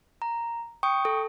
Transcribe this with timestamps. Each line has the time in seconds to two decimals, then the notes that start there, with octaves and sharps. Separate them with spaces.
0.22 A#5
0.83 G5 C#6 D#6
1.05 A4